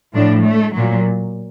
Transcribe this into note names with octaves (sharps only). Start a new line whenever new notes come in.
A2 F3 D4
A3
A#2 F#3